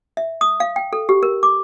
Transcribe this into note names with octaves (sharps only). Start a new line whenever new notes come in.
E5
D#6
F5
G5
A4
G4
A#4
D6